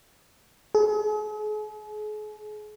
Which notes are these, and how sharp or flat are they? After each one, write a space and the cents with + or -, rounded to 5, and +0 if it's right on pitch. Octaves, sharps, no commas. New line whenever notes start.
G#4 +40